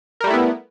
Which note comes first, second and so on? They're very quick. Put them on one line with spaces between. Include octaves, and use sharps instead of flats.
A#4 G3 A3 E4 B3